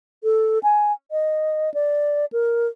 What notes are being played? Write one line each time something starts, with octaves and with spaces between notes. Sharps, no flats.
A4
G#5
D#5
D5
A#4